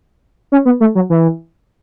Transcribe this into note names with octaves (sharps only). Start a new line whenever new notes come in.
C#4
B3
A3
F#3
E3